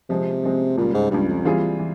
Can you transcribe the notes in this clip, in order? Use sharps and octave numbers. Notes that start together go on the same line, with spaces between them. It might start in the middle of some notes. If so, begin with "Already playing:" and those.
C3 F3 G#3 C4
F3 G#3 C4
C#2 A#2 C#3 G3
G#2
C#2 G2 C#3 G3
F2
E3 G3 C4 F4 G#4
E3